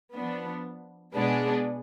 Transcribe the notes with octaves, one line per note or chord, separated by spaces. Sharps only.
F3 B3 D4
B2 G#3 B3 D4 G#4